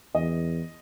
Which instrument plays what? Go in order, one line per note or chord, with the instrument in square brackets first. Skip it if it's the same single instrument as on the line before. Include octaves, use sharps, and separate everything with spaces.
[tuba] E2 [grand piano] D#5